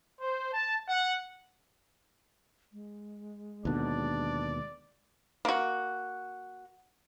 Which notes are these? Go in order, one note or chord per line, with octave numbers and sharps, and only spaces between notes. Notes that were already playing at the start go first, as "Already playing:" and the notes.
C5
A5
F#5
G#3
D#2 B2 D3 D4 D5
A#3 F#4